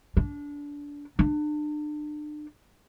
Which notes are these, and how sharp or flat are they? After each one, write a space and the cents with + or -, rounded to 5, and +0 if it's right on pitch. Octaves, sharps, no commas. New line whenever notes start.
D4 -20
D4 +35